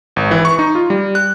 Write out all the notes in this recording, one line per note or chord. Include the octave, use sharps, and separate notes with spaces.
G#1
E3
C#6
D#4
F4
G3
F#6